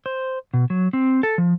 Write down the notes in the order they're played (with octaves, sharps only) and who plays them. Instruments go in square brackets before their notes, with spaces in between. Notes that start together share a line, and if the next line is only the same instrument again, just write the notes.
[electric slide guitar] C5
B2
F#3
C4
A4
F3